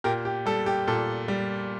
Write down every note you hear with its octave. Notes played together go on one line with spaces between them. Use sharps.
A#2 G4 A#4
G4
G3 A4
G4
A#2 A4
G3